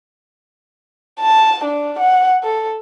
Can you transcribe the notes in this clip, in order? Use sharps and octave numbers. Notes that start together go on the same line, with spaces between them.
A5
D4
F#5
A4